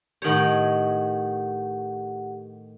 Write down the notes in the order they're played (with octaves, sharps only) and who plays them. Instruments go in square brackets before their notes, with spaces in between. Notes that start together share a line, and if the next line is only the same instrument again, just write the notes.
[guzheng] A2 D#3 C#5 [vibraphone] G4 F#5